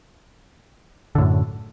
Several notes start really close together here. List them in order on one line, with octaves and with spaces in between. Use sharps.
D3 A2 F#2